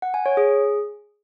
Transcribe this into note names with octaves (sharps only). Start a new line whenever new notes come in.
F#5
G#5
C#5
G#4